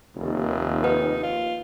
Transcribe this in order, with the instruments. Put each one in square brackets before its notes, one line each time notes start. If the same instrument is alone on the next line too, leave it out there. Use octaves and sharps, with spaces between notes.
[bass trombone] F1 [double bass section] D#2
[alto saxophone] D#4 [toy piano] B4 F#5
[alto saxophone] F4